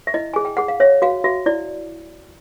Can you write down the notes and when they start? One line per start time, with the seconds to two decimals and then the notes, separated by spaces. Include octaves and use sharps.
0.07 E5
0.14 E4 D#5
0.34 G#4 G#5
0.45 G5
0.57 G#4 F#5
0.68 F5
0.80 C#5 E5
1.02 F#4 F5
1.24 F#4 E5
1.46 E4 D5